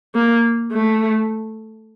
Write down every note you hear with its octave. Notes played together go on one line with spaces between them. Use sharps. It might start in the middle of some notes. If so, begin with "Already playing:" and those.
A#3
A3